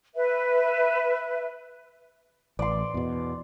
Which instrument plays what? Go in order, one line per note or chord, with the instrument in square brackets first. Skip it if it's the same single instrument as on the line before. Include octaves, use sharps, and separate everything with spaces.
[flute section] B4 E5
[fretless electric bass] A1 [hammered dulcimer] D5 C6
[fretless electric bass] E2 B2